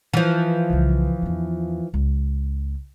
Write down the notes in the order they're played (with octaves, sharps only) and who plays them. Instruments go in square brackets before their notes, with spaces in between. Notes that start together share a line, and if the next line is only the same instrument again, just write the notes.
[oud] E3 F3
[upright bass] C2 C#3
E2 D4
C#2